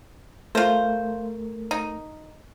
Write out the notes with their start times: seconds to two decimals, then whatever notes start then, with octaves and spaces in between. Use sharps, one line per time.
0.55 A3 F4 A#4 C5
1.71 D#4